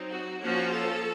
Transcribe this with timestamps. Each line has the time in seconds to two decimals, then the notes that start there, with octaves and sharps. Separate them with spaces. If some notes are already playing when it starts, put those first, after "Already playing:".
Already playing: F#3 C4 D#4
0.10 F#4
0.42 F3 A#3 C#4 F4 F#4
0.73 A4